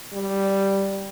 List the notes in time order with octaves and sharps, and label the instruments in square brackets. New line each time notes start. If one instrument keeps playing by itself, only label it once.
[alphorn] G3